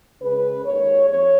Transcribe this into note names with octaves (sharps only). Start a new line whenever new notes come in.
C#3 G#3 C#4 B4
D#2 D#3 G#3 C#5
F2 C#5